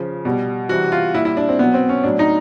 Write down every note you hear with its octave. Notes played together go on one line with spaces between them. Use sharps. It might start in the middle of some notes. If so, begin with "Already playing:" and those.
Already playing: C#3 F3
B2 G3
C3 E3 G3 F#4
F4
A#2 G3 E4
E4
D4
C4
B2 F#3 B3
C4
C#4
A2 F#3 D4
D#4